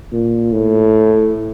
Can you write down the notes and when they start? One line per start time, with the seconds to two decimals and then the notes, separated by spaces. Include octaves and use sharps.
0.12 A#2
0.52 A2